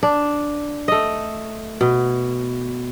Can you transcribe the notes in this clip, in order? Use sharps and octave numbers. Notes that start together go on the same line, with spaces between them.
D4
A3 D#5
B2